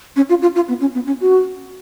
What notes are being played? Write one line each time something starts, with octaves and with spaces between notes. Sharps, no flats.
C#4
F4
F4
F4
B3
C#4
B3
C#4
F#4